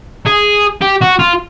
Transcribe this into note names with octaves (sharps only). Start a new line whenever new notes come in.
G#4
G4
F#4
F4